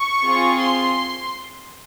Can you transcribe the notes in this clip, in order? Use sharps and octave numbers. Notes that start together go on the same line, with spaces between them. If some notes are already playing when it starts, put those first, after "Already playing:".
Already playing: C#6
C4 F4 G#4
C6